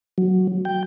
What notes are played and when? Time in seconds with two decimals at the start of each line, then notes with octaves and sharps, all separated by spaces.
0.18 F#3
0.65 G5